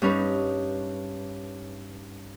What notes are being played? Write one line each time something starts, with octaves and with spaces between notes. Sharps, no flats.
G2 C#4 D#4 B4